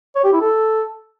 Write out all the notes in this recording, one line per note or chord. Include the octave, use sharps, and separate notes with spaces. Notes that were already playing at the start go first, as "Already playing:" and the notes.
C#5
G4
E4
A4